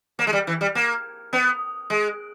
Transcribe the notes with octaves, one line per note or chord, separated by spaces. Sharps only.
A#3
G#3
G3
E3
G3
A#3
B3
G#3